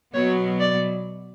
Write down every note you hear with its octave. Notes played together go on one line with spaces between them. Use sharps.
B2 F#3 B3 C#5
D5